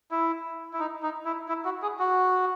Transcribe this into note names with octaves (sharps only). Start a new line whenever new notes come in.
E4
E4
D#4
D#4
E4
E4
F#4
G#4
F#4